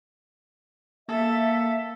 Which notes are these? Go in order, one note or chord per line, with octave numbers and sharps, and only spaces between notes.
A#3 A4 E5